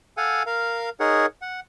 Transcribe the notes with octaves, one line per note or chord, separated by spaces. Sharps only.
A4 F5 F#5 G#5
A#4 F5
D#4 G#4 A#4 C#5 F#5
F#5